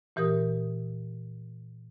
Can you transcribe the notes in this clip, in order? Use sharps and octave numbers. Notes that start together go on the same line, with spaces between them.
A#2 E3 G4 A#4 D#6